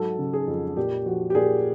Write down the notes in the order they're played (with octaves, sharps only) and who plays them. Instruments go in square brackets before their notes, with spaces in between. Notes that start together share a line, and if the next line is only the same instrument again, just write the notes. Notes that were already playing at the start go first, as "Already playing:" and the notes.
Already playing: [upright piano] G#2 F#3 A4
C#3
G#4
F2
A#2 G4
F3 F#4
G4
A#2 G#4